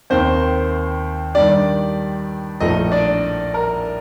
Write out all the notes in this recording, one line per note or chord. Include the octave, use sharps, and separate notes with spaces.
D#2 D#3 A#3 C4 C5
G2 D#3 G3 D4 D5
A#1 A2 F3 A3 D#4 D#5
D4 D5
A#4